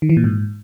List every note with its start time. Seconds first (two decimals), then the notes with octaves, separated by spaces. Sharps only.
0.02 D#3
0.10 E3
0.17 A#2
0.24 G#2